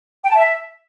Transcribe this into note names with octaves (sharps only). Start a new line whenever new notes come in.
G5
A5
E5